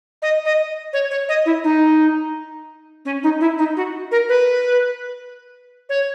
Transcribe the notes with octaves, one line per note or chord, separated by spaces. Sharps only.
D#5
D#5
C#5
C#5
D#5
E4
D#4
C#4
D#4
E4
D#4
F#4
A#4
B4
C#5